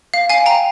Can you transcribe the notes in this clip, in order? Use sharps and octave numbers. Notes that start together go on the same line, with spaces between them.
F5
F5 G#5
G5 A#5